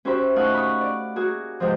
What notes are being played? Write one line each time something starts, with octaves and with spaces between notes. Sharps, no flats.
C#4 F#4 G4 C5 E5 B5
A#2 A3 D#4 F5 F#5 C#6
B5 C#6 D#6
D5
A#3 F#4 G#4
E2 G#2 C3 F3